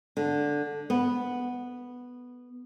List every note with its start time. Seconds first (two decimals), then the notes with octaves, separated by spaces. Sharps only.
0.17 D3
0.90 B3